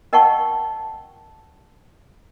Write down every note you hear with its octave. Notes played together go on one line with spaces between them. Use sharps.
A#4 D#5 F#5 G5 A5 C#6